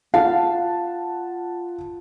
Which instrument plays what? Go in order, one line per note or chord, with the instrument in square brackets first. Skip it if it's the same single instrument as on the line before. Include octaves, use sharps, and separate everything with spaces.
[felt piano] F4 F#5 A5 [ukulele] F5